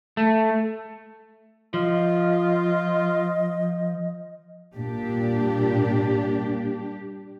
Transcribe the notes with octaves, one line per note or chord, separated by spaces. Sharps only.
A3
F3 F4 D#5
A#2 G3 D4 G4